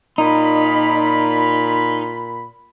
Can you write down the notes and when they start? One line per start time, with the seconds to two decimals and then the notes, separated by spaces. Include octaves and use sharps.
0.18 A#2 D#4 B5